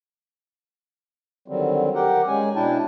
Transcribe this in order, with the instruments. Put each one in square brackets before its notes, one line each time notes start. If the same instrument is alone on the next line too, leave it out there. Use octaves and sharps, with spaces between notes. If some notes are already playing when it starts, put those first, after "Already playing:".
[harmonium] D3 D#3 F#3 G3 C4
G4 A#4 F#5 G5
G#3 C#4 G#5
B2 D4 E4 G5 A5